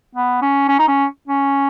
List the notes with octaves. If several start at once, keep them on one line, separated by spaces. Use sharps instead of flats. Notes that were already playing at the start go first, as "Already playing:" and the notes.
B3
C#4
C#4
D#4
C#4
C#4